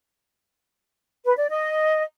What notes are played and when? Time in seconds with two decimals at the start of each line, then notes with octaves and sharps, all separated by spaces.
1.24 B4
1.36 D5
1.48 D#5